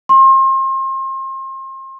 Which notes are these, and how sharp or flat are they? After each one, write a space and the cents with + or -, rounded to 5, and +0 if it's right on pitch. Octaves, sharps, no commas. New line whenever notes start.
C6 +35